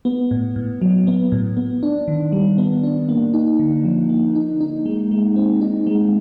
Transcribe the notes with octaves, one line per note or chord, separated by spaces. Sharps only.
B3
A2
A2
F#3
B3
A2
B3
D4
D#3
G3
B3
D4
A#3
D#4
D3
F3
A#3
D#4
D#4
G#3
G#3
C4
D#4
G#3